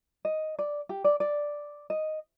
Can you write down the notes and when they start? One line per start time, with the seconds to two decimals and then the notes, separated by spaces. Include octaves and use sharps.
0.25 D#5
0.59 D5
0.89 G4
1.04 D5
1.20 D5
1.90 D#5